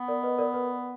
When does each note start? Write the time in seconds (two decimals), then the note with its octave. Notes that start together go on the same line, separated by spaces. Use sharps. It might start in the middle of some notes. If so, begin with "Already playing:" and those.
Already playing: B3
0.08 A#4 D5
0.23 B4 D#5
0.38 A#4 D5
0.54 B4